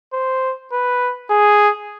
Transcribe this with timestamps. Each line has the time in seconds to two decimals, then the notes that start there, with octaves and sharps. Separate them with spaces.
0.13 C5
0.73 B4
1.30 G#4